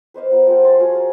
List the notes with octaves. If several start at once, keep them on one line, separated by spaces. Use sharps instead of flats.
B4 C5 D#5 F5
B3 F4 A#4
F3 G#3 F#5 G5
F5 G#5 A5 C6
F4 F#4 G#4 F5
A#4